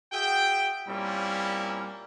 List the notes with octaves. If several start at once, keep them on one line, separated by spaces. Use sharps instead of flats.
F#4 G#4 E5 G5
A#2 G3 A#3 C4 C#4 E4